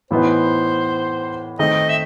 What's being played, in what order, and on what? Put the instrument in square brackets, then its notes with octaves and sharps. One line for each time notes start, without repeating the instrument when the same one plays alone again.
[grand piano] A2 E3 B3 D#4 [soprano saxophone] C5
[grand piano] D#3 A3 C4 D#4 [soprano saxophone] D#5
[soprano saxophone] E5